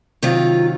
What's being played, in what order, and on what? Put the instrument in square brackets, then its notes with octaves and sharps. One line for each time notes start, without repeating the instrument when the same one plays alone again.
[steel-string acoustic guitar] C3 D#3 F#3 F4